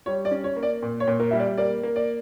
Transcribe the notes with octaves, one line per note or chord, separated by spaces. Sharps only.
G3 C#5
D5
C#4
C#5
A#3
D5
A#2
C#5
A#2
A#4
G3 E5
D5
A#3 D5
A#3
D5